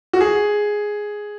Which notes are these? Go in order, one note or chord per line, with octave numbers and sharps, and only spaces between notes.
F#4
G#4